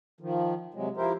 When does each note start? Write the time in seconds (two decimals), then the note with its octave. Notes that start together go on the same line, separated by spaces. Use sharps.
0.21 D#3 F3
0.74 C3 F#3 G#3
0.97 F3 E4 G4 A#4 C5